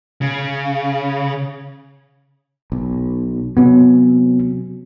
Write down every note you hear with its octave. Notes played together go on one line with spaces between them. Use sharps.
C#3
B1
C3 F#3 B3 C#4